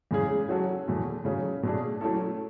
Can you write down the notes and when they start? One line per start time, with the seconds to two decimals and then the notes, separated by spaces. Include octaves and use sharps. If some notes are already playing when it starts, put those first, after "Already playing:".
0.11 E2 C#3 G#3 C#4 G#4
0.49 F#3 C#4 F#4 A4
0.88 E2 B2 A3
1.25 C#3 F#3 C#4
1.63 B2 A3 D4 G#4
2.01 F#3 A3 C#4 E4 A4